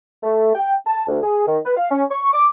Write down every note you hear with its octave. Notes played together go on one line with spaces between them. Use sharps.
A3
G5
A5
D2
G#4
D#3
B4
F5
C#4
C#6
D6